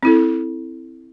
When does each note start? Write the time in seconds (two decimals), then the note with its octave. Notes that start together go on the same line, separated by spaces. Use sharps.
0.03 C4 E4 A4